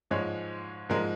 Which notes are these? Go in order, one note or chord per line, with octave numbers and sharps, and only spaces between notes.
G#2 F3 G#3 C#5
G#2 F3 G#3 A#4